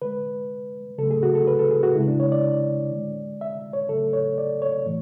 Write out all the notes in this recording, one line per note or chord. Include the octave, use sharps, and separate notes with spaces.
D3 G#3 B4
C#3 F#3 A3 A4
G#4
F#4
A4
B4
A4
G#4
F#4
C#3 G#3 E4
D4
C#5
D5
D3 G#3
E5
C#5
C#3 F#3 A3 A4
C#5
D5
C#5
A2 E3 A3